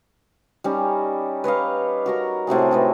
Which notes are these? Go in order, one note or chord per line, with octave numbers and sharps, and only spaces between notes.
G3 C#4 D#4
B4 C#5 D#5 F5
F#4 A#4 A#5
A2 C3 F#4 G#4
A3 D#4 B4